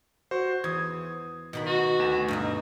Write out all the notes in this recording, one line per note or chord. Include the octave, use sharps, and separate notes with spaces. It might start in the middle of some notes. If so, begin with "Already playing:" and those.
F#4 C5
E2 D#6 G#6
B2 D#3 B5
F#4
D2 E7
G2 B2 D#4